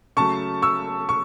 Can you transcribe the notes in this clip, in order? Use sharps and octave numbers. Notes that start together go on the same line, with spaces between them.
C#3 F#3 A3 A5 C#6
C#6 E6
C#6